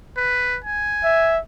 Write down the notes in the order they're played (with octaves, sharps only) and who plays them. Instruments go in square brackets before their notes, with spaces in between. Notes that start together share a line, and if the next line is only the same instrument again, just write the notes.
[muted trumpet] B4
G#5
[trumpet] E5